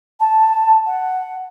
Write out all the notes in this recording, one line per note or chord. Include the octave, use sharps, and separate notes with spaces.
A5
F#5